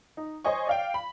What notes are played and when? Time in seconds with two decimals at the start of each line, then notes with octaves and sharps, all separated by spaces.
0.17 D#4
0.45 C5 C#5 D#5 G#5 C#6
0.67 D5 F5 G5
0.94 B5